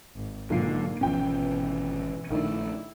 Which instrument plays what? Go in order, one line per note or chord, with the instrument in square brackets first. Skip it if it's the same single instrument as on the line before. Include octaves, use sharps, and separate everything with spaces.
[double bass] G#1
[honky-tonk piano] B1 F4 C7 [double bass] G#2 A#3 [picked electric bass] D3
[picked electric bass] G#1 C#4 [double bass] B2 E3 [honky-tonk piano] F3 B3 G5
[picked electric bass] A#1 A3 [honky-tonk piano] D#3 D4 [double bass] E4